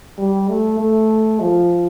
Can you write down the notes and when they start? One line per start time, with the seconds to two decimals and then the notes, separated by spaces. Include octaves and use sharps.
0.18 G3
0.49 A3
0.80 A3
1.41 F3